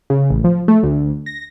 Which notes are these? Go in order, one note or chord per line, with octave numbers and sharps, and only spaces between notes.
C#3
A1
F3
A3
D2
A#6